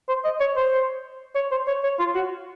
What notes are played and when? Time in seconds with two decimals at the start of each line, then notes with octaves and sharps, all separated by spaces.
0.08 C5
0.24 D#5
0.40 C#5
0.56 C5
1.35 C#5
1.51 C5
1.67 C#5
1.83 C#5
1.99 F4
2.15 F#4